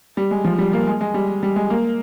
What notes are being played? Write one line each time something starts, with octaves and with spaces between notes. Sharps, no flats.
G3
G#3
F3
G3
A#3
G#3
G#3
G3
G3
G#3
A#3